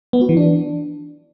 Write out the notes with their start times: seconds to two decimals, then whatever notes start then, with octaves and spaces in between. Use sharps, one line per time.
0.13 B3
0.21 F#4
0.29 E3
0.37 D4